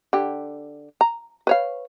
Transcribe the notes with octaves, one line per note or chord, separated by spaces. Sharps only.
D3 G4
A#5
B4 C#5 F5